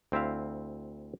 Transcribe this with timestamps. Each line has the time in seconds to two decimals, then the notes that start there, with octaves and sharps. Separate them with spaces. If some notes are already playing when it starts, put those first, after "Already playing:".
0.12 D2 C4 E4 E5 F5